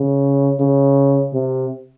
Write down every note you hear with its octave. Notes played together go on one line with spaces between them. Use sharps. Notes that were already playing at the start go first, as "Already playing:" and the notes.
Already playing: C#3
C#3
C3